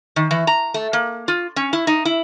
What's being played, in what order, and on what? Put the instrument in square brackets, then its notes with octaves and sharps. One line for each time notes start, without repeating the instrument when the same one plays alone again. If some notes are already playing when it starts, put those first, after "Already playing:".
[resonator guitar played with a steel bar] D#3
E3
A#5
A3
A#3
F4
C#4
E4
D#4
E4